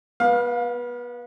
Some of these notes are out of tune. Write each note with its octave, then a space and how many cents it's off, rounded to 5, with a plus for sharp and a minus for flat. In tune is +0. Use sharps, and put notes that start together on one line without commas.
B3 -25 F5 +25